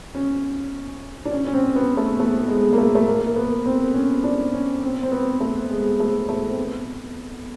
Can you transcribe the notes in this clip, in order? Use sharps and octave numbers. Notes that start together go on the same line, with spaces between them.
C#4
D4
C#4
C#4
C4
B3
A3
A3
G#3
A#3
A3
A3
A#3
A#3
B3
C4
C#4
D4
C#4
C4
C4
B3
A3
G#3
A3
A3
C4
B3